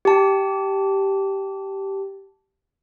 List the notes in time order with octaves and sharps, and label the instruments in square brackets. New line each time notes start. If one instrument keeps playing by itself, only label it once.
[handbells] G4 A5